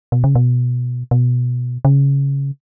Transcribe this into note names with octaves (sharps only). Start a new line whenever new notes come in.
B2
C#3
B2
B2
C#3